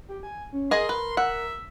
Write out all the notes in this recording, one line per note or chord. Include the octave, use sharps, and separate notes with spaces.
G4
G#5
C#4
G#4 A#4 D#5 C6
B4
E5 F#5